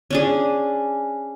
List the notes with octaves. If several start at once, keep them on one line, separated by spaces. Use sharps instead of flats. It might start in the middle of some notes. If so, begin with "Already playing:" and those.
C#4 D4 G#4